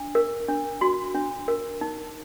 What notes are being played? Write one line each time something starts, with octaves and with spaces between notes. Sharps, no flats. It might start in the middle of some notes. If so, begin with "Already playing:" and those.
Already playing: D4
A#4
D4
F#4 C6
D4
A#4
D#4